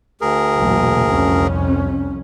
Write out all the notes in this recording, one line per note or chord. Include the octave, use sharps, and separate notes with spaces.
D2 G#4 A#4
B1 E2 A#2
C2 F2 C#4